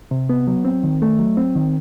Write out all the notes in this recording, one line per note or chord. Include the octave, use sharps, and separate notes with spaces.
C3
B3
F#3
C4
D#3
A3
F#3
C4
D#3